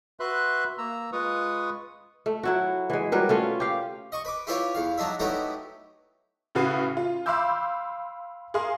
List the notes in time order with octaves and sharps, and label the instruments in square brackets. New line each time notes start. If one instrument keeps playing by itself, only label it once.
[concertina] F#4 B4 E5 C6 F#6
A#3 A#5 E6
G#3 F4 B4 C#6 D#6
[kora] A3
F#3 E4 F#4
E3 G#3
F#3 G3 A#4 B4
A3 C#4 F4
G4 F5
[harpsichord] D#5 C#6
B4 D6
E4 F4 G4 B4 C#5 D5
E2 F5
F#3 D4 D#4 E5
F#3 A3 B3 D#4 E4 G4
[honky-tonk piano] A2 C#3 F#4 B4 C7
F4
F5 B5 C6 D6 E6 G6
G#4 A#4 F5 C6